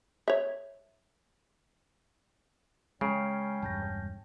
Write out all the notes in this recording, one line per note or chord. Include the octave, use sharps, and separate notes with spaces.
C#5 E5
C#3 G#3 C#4 G5 A#5 C7 D7
E1 G2 A5 G6 A#6